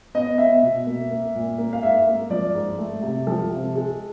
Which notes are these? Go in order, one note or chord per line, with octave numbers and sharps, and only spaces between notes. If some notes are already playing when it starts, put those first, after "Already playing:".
B3 D#5
B3 E5
B2
A#3
A#3
A#2
A#3
F5
G#2 E5
A#3
F3 D5
G#2
A3
C3
F3 A4
C3
G#3